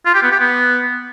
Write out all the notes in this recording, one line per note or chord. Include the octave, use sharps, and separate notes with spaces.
F4
G4
B3
G4
B3